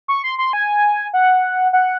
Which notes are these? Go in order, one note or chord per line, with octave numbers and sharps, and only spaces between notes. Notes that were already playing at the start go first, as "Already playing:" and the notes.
C#6
C6
C6
G#5
F#5
F#5